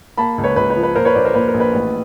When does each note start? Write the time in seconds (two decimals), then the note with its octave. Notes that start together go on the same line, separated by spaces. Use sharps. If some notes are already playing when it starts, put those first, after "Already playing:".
0.17 A#3 A5 B5
0.38 C#2
0.44 B4 C#5
0.56 C#2 B4
0.70 B4
0.76 F3
0.83 B4
0.95 A#2 A#4 C5
1.05 B4 C#5
1.15 A#1 C5 D5
1.25 A#4 C5
1.34 A#2 B4
1.48 A#4
1.54 A#1
1.60 B4
1.74 A1